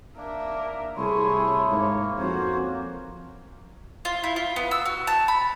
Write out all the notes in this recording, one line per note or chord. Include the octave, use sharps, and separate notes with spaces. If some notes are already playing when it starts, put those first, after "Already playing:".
A#3 D4 A#4 E5
C2 A3 E4 G#4 C#5 C6
G#2 A#3 C#5
F2 C#4 F#4 C5 C#5
F4
E4
F4
B3
E6
F#4
A5
B5